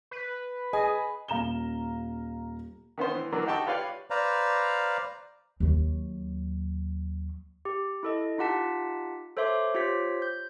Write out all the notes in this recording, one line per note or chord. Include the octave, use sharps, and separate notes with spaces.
B4
G#4 D#5 G#5
D#1 F5 A#5 E7 G7
D#3 B3 C#4 C5
E3
E3 F#3 A#3 D4
D#4 F#4 G4 G5 A5 C#6
F4 G4 B4 C#5 D5 F5
B4 C5 D5 F5 A#5
D#2 F#3
G4
E4 A4 D#5
D#4 F4 G4 F#5 A5 B6
A4 C5 C#5 E5 C6 D6
F4 G4 C5 C#5 B6
G6